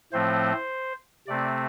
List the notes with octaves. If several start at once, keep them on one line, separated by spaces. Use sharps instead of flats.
A2 F3 A3 C4 C5
C3 A3 C4 D5